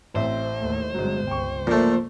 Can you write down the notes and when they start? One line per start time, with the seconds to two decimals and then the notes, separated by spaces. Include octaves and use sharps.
0.15 A1 C4 C5 E5
0.58 D#2 A3
0.94 G1 G2 C3 F#3 G#3
1.27 C#2 G5 C#6
1.67 A#2 F3 A3